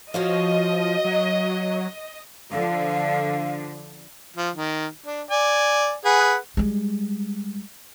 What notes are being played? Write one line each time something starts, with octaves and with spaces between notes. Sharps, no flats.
F3 F#4 C#5 D#5 F5
F#3
D3 F3 F5
F3
D#3
D4
D5 G#5
G#4 B4 F#5
G3 G#3